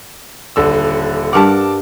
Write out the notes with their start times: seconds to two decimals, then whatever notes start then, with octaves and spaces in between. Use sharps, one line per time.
0.56 D#1 D3 E6
1.33 G2 A#4 F#5 A5 D6